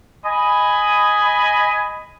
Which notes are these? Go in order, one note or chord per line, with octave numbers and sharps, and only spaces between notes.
D#5 G#5 B5